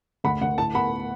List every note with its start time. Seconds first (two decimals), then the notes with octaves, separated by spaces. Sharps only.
0.24 D2 F#5 B5
0.41 D2 F#5
0.58 A2 A5
0.75 B3 F#5 B5